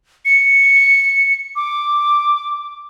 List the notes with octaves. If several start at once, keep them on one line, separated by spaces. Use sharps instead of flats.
C#7
D6